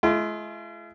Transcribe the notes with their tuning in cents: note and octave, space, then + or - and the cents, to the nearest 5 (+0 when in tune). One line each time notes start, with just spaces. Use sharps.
G#3 +45 F4 -45